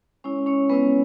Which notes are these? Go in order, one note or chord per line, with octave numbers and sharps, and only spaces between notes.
G#3 C#4 E4 C#5
C#4 C#5
G#3 B3 C#4 E4 B4